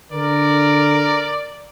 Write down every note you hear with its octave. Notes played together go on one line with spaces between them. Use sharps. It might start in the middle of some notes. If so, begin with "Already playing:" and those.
D3 A#4 D5